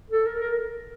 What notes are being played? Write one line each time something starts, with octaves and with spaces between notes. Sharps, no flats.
A4
A#4
A#4